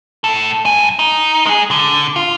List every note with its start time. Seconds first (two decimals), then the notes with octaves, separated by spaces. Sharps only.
0.24 A2 A4
0.65 G2 G#5
0.99 D#4
1.46 G#3 G#4
1.71 D3
2.16 F4